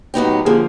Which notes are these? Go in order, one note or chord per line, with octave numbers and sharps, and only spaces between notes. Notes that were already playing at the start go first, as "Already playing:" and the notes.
A2 F#3 B3 D#4 G4
D3 F3 A#3 G#4